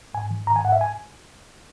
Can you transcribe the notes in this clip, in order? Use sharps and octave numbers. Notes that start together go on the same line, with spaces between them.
G#2 G#5
D#3
G#2 A#5
G#5
G#2 F#5
E5
G#5